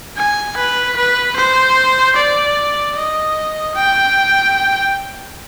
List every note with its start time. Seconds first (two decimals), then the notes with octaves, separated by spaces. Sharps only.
0.17 G#5
0.57 B4
0.97 B4
1.37 C5
2.16 D5
2.96 D#5
3.76 G5